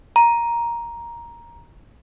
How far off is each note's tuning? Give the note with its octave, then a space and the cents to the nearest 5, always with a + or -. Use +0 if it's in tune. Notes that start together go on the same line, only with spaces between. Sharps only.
A#5 +10